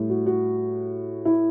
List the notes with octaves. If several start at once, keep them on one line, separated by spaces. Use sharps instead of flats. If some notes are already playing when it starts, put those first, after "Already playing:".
Already playing: A2 G3
F#4
F#4
E4